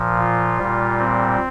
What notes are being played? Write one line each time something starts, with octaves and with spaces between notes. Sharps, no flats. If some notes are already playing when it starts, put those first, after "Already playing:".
Already playing: A#2 F3
F4
A#2 G3
C4